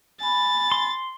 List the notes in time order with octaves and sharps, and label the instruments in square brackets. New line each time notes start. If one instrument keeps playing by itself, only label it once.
[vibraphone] G#5 B5 [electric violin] A6
[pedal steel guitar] C6